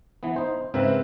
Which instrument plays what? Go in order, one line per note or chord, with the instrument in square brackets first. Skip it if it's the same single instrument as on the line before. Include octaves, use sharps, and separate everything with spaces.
[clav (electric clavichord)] E3 B3
D#4 C5
[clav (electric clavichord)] G#2 C#3 A#4 [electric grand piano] C4 B4 E5